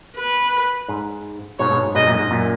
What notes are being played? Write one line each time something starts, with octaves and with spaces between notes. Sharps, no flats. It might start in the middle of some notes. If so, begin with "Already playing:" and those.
B4
G#2
G#2 B2 C#5
G#2 B2
G#2
G#2 B2 D#5
F#2 A#2
G#2
F#2 A#2